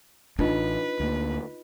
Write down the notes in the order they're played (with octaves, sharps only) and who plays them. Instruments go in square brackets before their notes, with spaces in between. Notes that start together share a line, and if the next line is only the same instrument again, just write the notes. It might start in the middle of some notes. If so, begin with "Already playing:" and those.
[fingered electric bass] A1 [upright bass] D4 [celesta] D#4 F4 D#5 [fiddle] B4
[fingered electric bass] D2 A#3